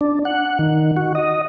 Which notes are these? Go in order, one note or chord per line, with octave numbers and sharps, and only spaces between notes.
D4
F#5
D#3
F#4
D#5